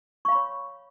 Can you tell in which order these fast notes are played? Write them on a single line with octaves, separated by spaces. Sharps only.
C#6 F5 B5 C#5